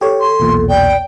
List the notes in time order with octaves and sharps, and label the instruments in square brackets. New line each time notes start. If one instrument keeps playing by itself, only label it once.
[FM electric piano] G4 C#5 [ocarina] A4
[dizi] C6
[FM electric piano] B1 E2 A#2
[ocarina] D5 [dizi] G5